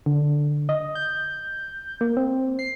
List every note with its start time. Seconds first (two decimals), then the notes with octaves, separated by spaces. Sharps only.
0.06 D3
0.69 D#5
0.95 G6
2.01 A#3
2.17 C4
2.59 C7